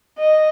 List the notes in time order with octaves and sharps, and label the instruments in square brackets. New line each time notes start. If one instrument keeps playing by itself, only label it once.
[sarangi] D#5